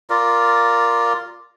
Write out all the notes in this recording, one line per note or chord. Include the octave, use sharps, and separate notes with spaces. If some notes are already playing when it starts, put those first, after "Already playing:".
F4 A#4 D5